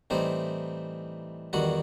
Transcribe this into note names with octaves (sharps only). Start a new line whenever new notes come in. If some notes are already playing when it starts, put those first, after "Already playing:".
A2 E3 G3 C4 D#4 C5
E2 D#3 G3 F#4 F#5